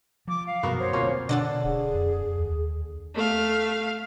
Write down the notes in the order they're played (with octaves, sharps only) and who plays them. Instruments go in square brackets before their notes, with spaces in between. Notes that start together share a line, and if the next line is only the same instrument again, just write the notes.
[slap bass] F3 [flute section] D6
[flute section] F5
[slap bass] F#2 B2 [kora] B3 F#4 A#4
[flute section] C5 C#5
[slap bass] F1 D2 C4 [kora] A#3 C#4 F4
[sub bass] B2 [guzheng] D3 D4 A4
[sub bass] D1 [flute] G#4
[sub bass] F2
D#2
[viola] A3 F5